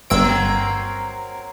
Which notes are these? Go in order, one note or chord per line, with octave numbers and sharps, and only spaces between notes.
G1 F#3 A#3 C4 E6 D7